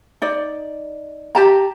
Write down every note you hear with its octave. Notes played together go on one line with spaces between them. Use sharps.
D#4 D5
G4 A5 A#5